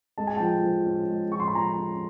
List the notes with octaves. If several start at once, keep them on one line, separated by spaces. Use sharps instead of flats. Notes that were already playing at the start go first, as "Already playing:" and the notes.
G#3 A5
G#5
F3 G5 A5
F3
C#4
G#3
F3 C#6
C6
B5
F3 G#5 A#5
C#4